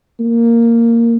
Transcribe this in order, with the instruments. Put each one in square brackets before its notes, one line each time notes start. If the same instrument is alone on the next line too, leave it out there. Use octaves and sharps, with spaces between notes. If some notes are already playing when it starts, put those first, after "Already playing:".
[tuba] A#3